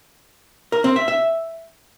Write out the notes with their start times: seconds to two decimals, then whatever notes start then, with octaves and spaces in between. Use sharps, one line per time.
0.72 A#4
0.84 C4
0.96 E5
1.08 E5